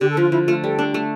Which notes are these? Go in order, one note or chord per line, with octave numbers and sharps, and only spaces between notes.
D3 G4
A4
F3 F4
F3 E4
A3 F4
G3 A4
D4
A3